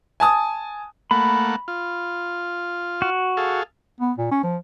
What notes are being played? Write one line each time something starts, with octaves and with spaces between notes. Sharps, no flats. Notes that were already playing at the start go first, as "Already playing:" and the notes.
G#5 A5 D#6
A3 A#3 F#5 B5
F4
F#4
G#4 A4 F5
B3
A#2
C#4
F3